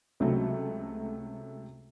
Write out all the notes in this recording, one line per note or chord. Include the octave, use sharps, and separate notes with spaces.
C#2 C3 F#3 A3